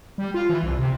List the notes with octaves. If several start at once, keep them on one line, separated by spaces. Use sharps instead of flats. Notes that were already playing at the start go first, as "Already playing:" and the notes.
G3
F4
E3
C2
C3